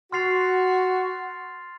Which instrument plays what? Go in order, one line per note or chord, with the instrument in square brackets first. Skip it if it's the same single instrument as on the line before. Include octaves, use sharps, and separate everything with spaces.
[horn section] F#4 [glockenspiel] C6 F6 A6 C7 F7